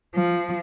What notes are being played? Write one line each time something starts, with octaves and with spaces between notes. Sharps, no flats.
F3